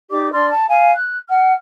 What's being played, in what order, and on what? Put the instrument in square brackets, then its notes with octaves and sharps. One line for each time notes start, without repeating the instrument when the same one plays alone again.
[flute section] D#4 G4 D5 D6
D4 D5 C6 F6
A5
F5 G#5
F#6
F#5 F6